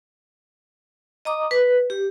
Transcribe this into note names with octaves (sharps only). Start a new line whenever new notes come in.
D#5 A#5 D6 D#6
B4
G4